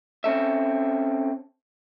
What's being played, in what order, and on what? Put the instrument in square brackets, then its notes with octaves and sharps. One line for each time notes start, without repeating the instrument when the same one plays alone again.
[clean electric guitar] C4 C#4 A4 E5